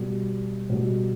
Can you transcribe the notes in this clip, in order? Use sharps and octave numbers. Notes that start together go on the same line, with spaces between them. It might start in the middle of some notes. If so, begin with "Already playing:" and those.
Already playing: B2 G3
B2 G3